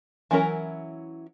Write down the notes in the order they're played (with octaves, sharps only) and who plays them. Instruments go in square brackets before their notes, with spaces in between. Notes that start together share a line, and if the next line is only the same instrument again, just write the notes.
[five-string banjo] E3 F#3 C#4 E4 A#4